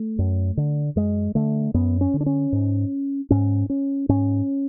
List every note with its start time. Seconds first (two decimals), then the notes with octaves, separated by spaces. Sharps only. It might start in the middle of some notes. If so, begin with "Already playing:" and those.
Already playing: A3
0.19 F#2
0.57 D3
0.96 F#2 G#3
1.35 D3 A3
1.74 F#2 B3
2.01 C#4
2.14 D3
2.21 D4
2.26 C#4
2.52 G#2
3.30 G#2 C#4
3.70 C#4
4.09 G#2 C#4